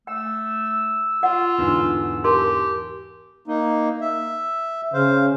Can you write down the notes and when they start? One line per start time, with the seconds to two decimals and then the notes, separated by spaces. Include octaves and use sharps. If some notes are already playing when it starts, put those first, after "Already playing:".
0.07 A3 G5 E6
1.23 F4 F#5
1.58 E2 G#2 D3
2.24 G4 A#4 A5 C6
3.47 A#3 D#4
4.01 E5
4.94 C#3 C5 F5